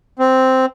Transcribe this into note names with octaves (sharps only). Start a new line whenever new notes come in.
C4